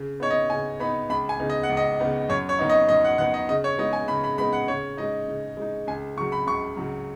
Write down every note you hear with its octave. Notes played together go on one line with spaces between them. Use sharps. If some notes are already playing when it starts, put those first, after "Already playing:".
Already playing: C#3
B3 D#4 C#5
D#5
C#3 G#5
B3 D#4 B5
C#2 B5
G#5
C#3 B3 D#4
D#5
F#5
C#2
D#5
C#3 B3 D#4
F#2 C#5
C#5
D#3 B3 D#4
D#5
F#2 D#5
F#5
D#3 B3 D#4 F#5
D#5
C#3 D#5
C#5
G#3 B3 D#4 D#5
G#5
C#3 B5
B5
G#3 B3 D#4 B5
F#5
C#3 C#5
G#3 D#4 D#5
C#3
G#3 D#4
C#2 G#5
C#3 F#3 C#6
B5
C#2 C#6
C#3 F#3